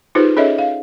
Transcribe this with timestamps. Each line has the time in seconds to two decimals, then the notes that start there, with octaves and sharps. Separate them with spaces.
0.15 D#4 F4 G4 G#4 B4 C5
0.37 C#4 G#4 A4 C#5 D#5 E5
0.58 F5